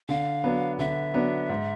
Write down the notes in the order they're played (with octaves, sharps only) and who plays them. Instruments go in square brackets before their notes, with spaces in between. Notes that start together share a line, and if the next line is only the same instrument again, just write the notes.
[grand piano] D3 [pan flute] F5
[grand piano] F#3 B3 D4
[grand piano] D3 [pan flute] E5
[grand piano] F#3 B3 D4
G#2